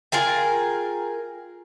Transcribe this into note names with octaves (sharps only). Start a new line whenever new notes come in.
F4 G#4 A#4 G5